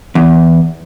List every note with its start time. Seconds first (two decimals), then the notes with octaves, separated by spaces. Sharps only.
0.15 E2